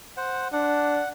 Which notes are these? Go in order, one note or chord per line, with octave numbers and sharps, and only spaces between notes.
C5 F#5
D4 F#5